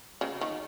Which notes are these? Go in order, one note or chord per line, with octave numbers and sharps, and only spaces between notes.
C#3
D#3